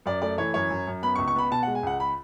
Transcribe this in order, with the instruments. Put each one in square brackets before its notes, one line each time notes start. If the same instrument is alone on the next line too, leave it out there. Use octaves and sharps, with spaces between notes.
[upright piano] F#2 D5
A3 D5
E3 C#5
F#2 C#5
F#2
F#2
B3 B5
C#2 C#6
C#6
B3 B5
B2 A5
F#5
G#3
G#5
C#2 F#5
B5